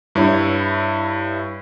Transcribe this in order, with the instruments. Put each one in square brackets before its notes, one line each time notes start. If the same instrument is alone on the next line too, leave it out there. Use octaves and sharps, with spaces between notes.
[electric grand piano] G2 E4 C#5